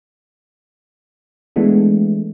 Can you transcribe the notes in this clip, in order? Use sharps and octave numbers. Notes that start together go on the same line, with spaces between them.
E3 G#3 A3 B3 D4